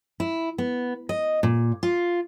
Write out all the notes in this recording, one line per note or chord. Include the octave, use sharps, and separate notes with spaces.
E4
B3
D#5
A#2
F4